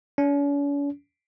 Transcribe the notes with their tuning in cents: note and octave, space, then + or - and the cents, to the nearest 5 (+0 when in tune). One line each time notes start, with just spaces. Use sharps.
C#4 +45